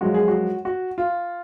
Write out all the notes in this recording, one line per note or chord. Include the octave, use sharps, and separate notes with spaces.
F#2 F3 G#3 F#4
G#4
F#4
F#4
F4